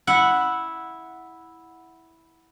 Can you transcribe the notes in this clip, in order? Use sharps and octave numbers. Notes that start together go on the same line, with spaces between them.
E4 F#5